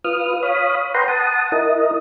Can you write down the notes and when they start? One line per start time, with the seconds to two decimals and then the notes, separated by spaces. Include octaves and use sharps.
0.05 F4 B4 D#6 F6
0.43 C#5 F5 B5 D#6
0.94 B4 F#5 G5 A#5 C6
1.08 F#5 A5 D#6
1.52 E4 A#4 D#5